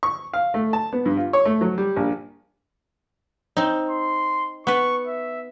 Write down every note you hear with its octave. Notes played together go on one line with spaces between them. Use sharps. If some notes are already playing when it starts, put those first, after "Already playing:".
C#6
F5
A3
A5
B3
G2
F4
C#5
A3
F#3
G3
A#1
C4 D#4
C6
B3 B4 C#6
E5